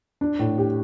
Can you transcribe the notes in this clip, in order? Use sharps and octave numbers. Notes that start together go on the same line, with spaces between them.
D4
A2
G4